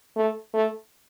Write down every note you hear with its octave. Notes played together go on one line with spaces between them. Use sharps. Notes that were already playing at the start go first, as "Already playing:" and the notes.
A3
A3